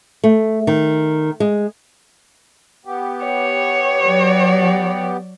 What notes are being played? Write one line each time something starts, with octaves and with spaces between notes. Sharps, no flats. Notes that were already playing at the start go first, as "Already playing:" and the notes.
A3
D#3
G#3
B3 G4
C#5
F#3 D5